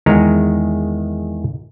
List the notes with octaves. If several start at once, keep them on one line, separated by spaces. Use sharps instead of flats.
E2 D#3 G#3 A#5